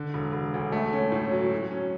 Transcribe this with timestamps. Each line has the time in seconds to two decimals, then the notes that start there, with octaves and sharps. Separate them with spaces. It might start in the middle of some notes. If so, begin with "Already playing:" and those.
Already playing: D3
0.14 E1
0.33 E1
0.54 D2
0.72 A3
0.93 C#4
1.12 A2
1.32 F#3
1.51 F#3
1.71 C#4